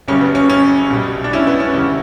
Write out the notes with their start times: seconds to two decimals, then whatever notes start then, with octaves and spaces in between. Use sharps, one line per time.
0.08 F#1 F#2 C#3 G3 C#4
0.21 B3
0.35 C#4
0.50 C#4
0.90 B1 B2 G3
1.24 D4
1.33 C#4 E4
1.47 B3
1.60 C#4
1.74 E1 D2 C#3 E3 G3 C#4 E4